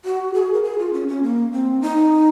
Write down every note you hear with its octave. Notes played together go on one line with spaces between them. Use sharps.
F#4
G#4
A#4
G#4
F4
C#4
C#4
A#3
C4
D#4